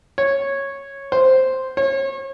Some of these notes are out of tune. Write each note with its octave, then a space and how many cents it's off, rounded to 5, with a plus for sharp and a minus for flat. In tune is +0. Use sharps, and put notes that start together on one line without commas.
C#5 -10
C5 +0
C#5 -35